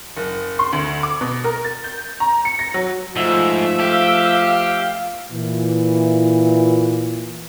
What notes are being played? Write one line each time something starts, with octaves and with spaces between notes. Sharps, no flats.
F#1
C6
D2
D6
B2
A#4
A6
G6
A#5
C#7
A#6
F#3
G#2 F3 A3 E5
G4 F5
A#2 E3